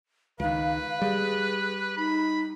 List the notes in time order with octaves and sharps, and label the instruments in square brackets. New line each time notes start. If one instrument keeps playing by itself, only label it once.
[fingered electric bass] C#2 D#3 [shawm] B4 [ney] F5
[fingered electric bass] G3 [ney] G#4
[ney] D#4 [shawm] B5